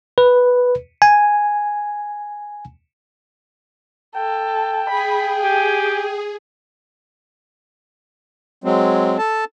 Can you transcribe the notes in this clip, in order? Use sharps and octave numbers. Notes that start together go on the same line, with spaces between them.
B4
G#5
A4 G5
G#4 B5
G4 G#5
F#3 G#3 C4
A4 A5